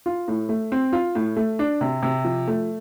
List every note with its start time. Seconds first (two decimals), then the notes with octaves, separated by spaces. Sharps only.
0.06 F4
0.28 A2
0.49 A3
0.72 C4
0.93 F4
1.15 A2
1.37 A3
1.59 D4
1.81 C3
2.03 C3
2.24 F3
2.48 A3